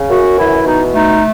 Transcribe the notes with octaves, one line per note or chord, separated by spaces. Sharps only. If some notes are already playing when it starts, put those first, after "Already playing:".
Already playing: C#3
F#2 F#4
E3 E4
B2 D#4
A3 D#4